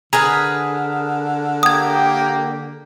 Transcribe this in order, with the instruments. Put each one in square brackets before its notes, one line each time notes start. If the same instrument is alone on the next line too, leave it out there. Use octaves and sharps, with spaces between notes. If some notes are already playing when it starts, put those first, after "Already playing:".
[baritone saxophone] D3 [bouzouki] G#4 A#4 B4 [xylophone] A#5
[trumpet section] A#3 G4 G5 [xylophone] D#6 G#6